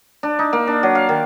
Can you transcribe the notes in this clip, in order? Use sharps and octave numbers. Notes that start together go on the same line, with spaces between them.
D4
D#4
A#3
D4
F#3
F5
D#3